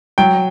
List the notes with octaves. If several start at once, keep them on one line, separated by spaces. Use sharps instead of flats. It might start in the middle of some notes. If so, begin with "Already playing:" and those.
F#3 G5